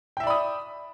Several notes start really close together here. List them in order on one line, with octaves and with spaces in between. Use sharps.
G5 E5 D5 B5 D#6